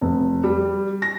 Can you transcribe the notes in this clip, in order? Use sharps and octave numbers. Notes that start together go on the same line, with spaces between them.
F1
G3
A#6